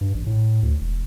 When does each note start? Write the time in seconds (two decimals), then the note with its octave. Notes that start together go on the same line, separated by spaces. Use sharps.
0.01 G2
0.14 A1
0.26 A2
0.63 D2
0.81 E1